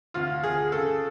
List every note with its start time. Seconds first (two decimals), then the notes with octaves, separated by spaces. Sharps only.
0.14 D2 F4
0.43 D2 G#4
0.72 C#3 A4